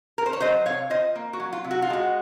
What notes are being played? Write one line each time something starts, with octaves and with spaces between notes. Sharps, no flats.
A#4
C5
C#5
F#3 C5 D#5
C3 C#5 F5
F4 C5 D#5
A#3
F#4
F#3
F4
C3
F#4
F4
G#3 F#4